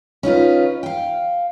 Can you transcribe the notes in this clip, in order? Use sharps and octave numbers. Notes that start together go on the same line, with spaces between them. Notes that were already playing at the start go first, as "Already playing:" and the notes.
C#4 D#4 F4 B4
F5 G5